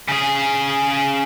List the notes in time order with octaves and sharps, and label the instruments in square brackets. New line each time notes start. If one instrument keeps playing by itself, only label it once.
[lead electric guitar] C#3 G#4